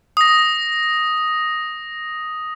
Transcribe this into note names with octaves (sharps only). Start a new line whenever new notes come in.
D#6 A#6